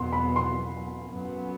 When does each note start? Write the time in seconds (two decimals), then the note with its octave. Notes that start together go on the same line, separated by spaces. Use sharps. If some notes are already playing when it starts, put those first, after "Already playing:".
Already playing: E2 B2 F#3 B3 C6
0.13 B5
0.36 C6
1.07 F#2 F#3 B3